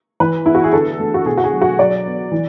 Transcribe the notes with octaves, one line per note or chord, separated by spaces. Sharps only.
E3 B4
B3 E4
F#4
G#4
D3 A4
A3
F#4
B2 G#4
F#4
G#4
F#3
F#4
F#3 D5
B3
E3